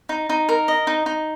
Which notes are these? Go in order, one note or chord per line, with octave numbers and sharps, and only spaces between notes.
D#4
D#4
A#4
D#5
D#4
D#4